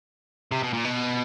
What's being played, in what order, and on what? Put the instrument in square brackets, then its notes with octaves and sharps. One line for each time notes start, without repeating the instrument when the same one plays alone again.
[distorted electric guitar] C3
B2
A#2
B2